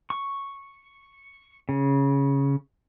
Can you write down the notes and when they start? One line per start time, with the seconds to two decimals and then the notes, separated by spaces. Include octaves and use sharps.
0.10 C#6
1.69 C#3